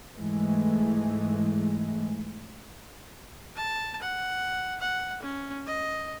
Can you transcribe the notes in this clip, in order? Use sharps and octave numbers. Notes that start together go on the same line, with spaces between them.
G#2 E3 G#3 A3
A5
F#5
F#5
C#4
D#5